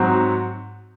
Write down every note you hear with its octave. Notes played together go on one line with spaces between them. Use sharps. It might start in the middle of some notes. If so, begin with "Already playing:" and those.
Already playing: G#2 F#3 C4 F#4